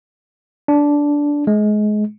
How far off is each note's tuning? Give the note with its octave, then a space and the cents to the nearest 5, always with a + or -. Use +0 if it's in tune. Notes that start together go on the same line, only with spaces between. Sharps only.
D4 -10
G#3 +25